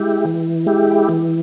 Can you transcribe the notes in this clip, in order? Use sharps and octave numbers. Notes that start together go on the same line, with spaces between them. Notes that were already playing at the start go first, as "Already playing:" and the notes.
Already playing: G#3 E4 G4
E3
G#3 E4 G4
E3